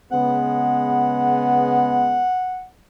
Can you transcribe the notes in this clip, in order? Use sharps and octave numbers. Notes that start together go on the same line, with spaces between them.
C#3 G#3 B3 F#5